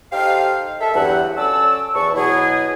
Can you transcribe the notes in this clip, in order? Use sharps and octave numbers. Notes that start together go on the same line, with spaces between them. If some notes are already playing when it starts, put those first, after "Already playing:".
D#4 G4 A4 C5 F5
A4 E5
E2 G2 F#3 F#5
F#3 C#4 A4 D5 A5 E6
E2 A5 C#6
B2 F#3 E4 G#4